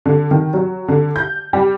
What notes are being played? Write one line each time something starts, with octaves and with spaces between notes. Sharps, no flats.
D3
D#3
F#3
D3
G6
G3